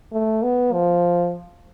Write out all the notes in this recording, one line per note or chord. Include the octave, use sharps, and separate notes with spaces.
A3
B3
F3